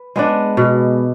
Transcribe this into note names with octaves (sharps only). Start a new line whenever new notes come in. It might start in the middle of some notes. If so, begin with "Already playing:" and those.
Already playing: B4
G#3 B3 D4
B2